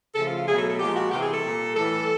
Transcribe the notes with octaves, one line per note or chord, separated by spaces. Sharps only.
C#3 F3 A3 A4
F4
F4
B2 F#3 A3 G#4
A4
A4
A#2 F3 G#3 G4
F#4
C3 E3 G3 G4
G#4
A4
A#2 G3
A2 E3 G3 A4